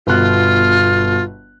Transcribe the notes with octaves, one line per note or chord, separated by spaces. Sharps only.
G1 B2 F4 F#6